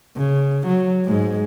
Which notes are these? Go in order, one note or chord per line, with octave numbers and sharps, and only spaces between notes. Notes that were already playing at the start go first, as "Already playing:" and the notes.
C#3
F#3
G#2 G#3